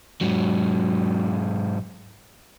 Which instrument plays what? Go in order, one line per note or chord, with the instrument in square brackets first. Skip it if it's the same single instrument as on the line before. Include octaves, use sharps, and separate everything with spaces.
[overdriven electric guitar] G#2 F#3